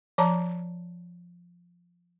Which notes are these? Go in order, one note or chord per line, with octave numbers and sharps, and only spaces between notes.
F3 C#5 A5 A#5